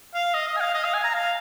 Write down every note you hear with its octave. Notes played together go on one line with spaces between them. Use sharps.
F5
D#5
D#5
G#5
F5
D#5
F5
G#5
A#5
F5